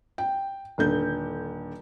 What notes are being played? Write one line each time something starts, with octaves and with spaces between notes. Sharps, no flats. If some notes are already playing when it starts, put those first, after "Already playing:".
G5
D#1 D3 G6